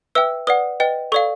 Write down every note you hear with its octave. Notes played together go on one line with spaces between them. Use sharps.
B4 E5 G5 E6
B4 D5 F#5 D#6
B4 D#5 G5
A4 D5 F5 C#6